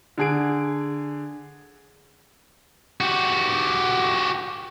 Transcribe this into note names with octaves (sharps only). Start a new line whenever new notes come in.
D3 G#4 D7
F#4 G4